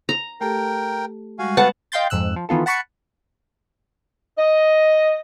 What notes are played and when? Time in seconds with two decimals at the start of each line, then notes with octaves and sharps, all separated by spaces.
0.09 A#5
0.41 A3 G4 A4 A#4 G5
1.39 G3 G#3 F#4 F5 G#5
1.57 B3 F#5 A5
1.92 D#5 F5 G5 C6 G6 A6
2.10 F2 G#2 E6 F#6
2.36 F3
2.49 D#3 E3 B3 F4 A4
2.66 F#5 A5 B5 C#6 F#6 C#7
4.37 D#5